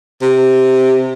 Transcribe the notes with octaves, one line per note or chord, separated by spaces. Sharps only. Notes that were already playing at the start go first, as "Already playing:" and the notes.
C3